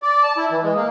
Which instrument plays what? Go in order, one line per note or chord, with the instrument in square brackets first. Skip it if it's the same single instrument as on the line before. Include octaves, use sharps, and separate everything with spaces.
[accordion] D5
A5
E4
E3
G#3
A#3